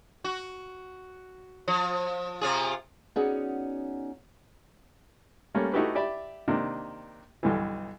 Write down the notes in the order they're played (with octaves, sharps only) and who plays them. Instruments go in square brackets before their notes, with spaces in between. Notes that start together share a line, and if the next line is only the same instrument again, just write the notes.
[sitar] F#4
F3
C3 F4 G#4
[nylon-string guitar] B3 C#4 D#4 F#4 G#4 D5
[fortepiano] G3 A3 A#3 C#4
A3 D#4 E4 F#4 G4 B4
G4 D5 E5 B5
C3 D#3 A#3 D4
B1 G2 D3 E3